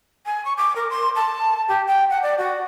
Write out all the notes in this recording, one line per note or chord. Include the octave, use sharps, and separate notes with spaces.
G#5
C#6
D6
A#4
C6
A5
G4
G5
F#5
D5
F#4